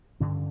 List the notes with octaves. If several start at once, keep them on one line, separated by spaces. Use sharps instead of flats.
G2 D3 C#4